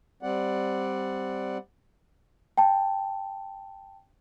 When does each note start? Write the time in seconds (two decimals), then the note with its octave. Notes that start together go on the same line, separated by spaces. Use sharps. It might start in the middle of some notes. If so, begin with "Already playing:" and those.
0.23 G3 C4 D5 F#5
2.58 G5 A5